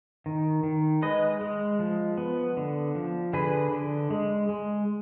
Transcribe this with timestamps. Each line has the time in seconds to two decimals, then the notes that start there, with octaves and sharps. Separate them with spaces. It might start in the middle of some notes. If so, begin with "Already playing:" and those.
0.26 D#3
0.64 D#3
1.02 G#3 B4 D#5
1.41 G#3
1.79 F3
2.18 B3
2.57 D3
2.95 F3
3.33 D3 G#4 B4
3.72 D3
4.11 G#3
4.49 G#3